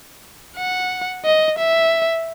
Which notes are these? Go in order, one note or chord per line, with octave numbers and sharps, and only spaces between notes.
F#5
D#5
E5